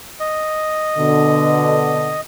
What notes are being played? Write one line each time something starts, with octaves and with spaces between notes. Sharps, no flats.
D#5
B2 D3